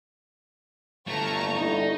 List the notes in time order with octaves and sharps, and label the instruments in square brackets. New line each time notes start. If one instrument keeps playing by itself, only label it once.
[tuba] G1 [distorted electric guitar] D3 A3 [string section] A5 A#5 C#6
[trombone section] D3 G3 E4 [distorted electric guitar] D#4